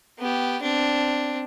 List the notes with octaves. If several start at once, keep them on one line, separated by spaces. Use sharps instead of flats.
B3 G4
C4 D4